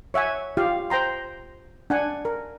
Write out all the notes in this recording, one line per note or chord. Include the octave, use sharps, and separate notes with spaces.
C#5 E5 F#5 G#5
F4 G4 F5
C5 G5 A#5 C6
D4 F#5 G#5
A#4